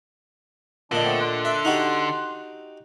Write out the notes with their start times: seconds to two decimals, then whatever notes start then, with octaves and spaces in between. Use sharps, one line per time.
0.92 A#2 D3 F3 D4 D#5
1.04 A3 B3 C4
1.21 C6 F#6
1.45 E5
1.65 D#4 F#4 G4